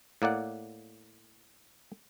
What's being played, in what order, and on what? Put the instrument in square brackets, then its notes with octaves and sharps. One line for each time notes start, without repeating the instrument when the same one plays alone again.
[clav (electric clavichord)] A2 A#3 D5 F#5